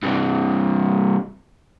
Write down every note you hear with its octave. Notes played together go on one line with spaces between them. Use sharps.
G2 C3